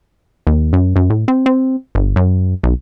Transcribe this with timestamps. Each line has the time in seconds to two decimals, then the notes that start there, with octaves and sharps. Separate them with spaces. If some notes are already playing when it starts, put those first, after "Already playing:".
0.47 D#2
0.73 F#2
0.96 F#2
1.10 A2
1.28 C4
1.46 C4
1.95 G1
2.16 F#2
2.64 B1